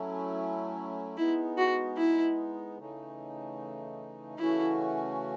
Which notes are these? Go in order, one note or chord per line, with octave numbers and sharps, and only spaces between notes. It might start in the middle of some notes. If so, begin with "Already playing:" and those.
Already playing: F#3 A3 C#4 E4
G#3 B3 D#4 E4
F#4
E4
C#3 E3 A3 D#4
C#3 E3 A3 C#4 E4 F#4